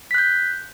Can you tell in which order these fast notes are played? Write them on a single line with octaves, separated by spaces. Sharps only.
B6 F#6 G6